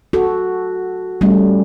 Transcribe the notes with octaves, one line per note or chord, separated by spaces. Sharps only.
F#4 A4
G3 A3 C#4